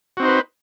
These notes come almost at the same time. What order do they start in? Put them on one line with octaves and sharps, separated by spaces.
F#4 C4 D#4 C5 B4